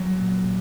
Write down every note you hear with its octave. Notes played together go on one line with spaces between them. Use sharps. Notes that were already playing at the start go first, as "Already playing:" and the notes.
Already playing: F#3
A#2
A#2